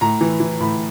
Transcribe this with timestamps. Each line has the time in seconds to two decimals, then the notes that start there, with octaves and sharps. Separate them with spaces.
0.01 A2 A#5
0.21 E3
0.40 E3
0.60 A2 B5